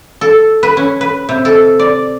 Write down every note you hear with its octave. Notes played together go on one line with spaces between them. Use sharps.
A4
B4
C#4
B4
C3
A4
D5